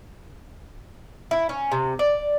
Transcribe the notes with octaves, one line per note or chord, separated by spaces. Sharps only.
E4
C#4
C3
D5